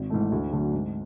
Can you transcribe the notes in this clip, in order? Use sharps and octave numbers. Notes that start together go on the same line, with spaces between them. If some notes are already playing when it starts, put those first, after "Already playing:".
Already playing: G#1
G#2 E3 A3
D2
D3 F#3 A3
G#2